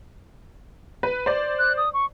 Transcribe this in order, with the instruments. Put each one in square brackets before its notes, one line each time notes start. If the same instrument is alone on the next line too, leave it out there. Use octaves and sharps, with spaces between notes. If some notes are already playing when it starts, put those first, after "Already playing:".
[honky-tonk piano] B4
C5 D5
[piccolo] F#6
D#6
C#6